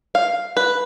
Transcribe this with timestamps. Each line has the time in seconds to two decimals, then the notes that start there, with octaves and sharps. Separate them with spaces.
0.15 F5
0.57 B4